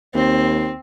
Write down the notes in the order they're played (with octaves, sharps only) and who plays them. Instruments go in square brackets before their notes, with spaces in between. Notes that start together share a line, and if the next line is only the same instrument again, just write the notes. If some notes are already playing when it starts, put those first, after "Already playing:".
[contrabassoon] D#2 [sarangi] C4